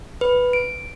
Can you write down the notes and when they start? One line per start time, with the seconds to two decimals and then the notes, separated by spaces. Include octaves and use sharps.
0.21 B4
0.53 D7